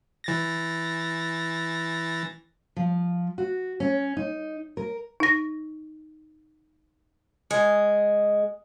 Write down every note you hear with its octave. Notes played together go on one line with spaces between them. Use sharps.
E3 A6 A#6
F3
F#4
C#4
D#4
A#4
D#4 A#6
G#3